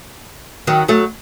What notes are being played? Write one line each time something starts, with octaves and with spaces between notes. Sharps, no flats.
D#3 F#3
F#3 A3